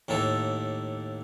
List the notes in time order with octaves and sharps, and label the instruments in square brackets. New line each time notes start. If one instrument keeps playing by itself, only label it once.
[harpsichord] D#2 A2 A#3 A4